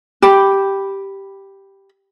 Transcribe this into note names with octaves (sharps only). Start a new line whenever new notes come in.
G4 B5